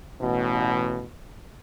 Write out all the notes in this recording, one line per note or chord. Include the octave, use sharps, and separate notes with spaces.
A1 B2